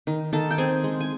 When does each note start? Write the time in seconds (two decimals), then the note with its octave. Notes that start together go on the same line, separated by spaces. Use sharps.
0.07 D#3
0.33 D#3 A4 A5
0.51 G5
0.58 C4 G#4 G#5
0.84 G#3
1.00 G#5